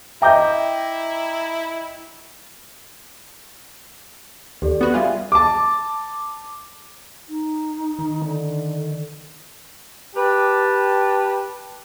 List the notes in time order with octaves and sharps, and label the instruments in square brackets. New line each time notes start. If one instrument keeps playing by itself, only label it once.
[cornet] E4 [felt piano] D#5 A#5 [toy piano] E5 [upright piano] G5 D6 G6
[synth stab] D#2 [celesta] G4 A4 D5
[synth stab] B3 F#4
[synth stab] G3 F4 G#4 [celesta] E5
[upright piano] A5 D6
[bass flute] D#4
[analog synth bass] D#3
[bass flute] D3
[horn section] G4 B4 A5